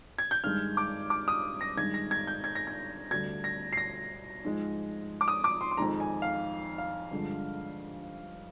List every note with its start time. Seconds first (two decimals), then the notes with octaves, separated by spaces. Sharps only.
0.18 G#6
0.31 G6
0.44 G2 D#3 G#3 F6
0.77 D6
1.10 D6
1.28 D#6
1.61 A#6
1.77 G2 D#3 G#3 G#6
1.94 A#6
2.11 G#6
2.27 G6
2.44 G#6
2.55 A#6
2.67 G#6
3.10 D2 D3 G3 G#6
3.44 A#6
3.73 C7
3.77 A#6
4.45 G#2 F3 G#3
5.21 D6
5.28 D#6
5.44 D6
5.61 C6
5.71 C6
5.77 F2 D#3 G#3 A#5
6.00 G#5
6.22 F5
6.78 F5
7.11 G2 D3 F3 G#3